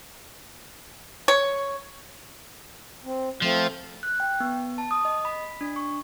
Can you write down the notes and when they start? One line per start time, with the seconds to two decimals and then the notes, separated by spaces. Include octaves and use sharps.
1.28 C#5
3.05 C4
3.42 F3 A3 C4 F4
4.03 F#6
4.20 G5
4.40 B3
4.78 A5
4.91 D#6
5.05 D#5
5.25 B5
5.61 D4
5.76 C#6